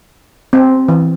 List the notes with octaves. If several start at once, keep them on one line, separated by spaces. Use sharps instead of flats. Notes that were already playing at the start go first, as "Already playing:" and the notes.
C4
E3